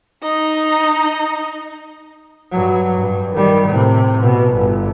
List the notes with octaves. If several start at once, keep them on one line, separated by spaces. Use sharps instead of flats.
D#4 D#5
G2 F#3
G2
D#3 G3
A2 C3
B2
G1